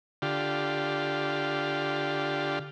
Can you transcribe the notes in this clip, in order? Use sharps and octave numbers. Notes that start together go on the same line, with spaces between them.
D3 F4 G4